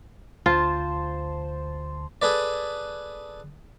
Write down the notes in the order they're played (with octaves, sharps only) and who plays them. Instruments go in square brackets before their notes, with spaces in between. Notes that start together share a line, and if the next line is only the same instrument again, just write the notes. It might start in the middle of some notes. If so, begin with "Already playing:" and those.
[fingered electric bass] D2 [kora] F4 [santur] C5 A5
[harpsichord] G#4 A4 B4 D5